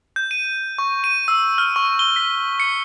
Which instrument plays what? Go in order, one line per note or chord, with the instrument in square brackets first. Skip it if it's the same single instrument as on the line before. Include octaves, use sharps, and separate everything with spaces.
[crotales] G6
D#7
C#6
D#7
E6
F6
C#6
G7
B6
C#7